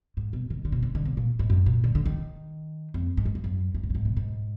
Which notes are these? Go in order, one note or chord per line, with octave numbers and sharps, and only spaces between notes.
G#2
B2
D#3
D3
B2
D3
D3
B2
A#2
G#2
F#2
A#2
D3
D3
D#3
F2
G#2
F#2
F2
F#2
F#2
G#2
F#2
G#2
B2
G#2